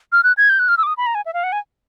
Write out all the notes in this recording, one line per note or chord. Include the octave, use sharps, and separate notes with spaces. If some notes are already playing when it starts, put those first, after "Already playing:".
F6
F#6
G#6
G6
F#6
F6
E6
D6
D#6
B5
A#5
G#5
E5
F5
F#5
G#5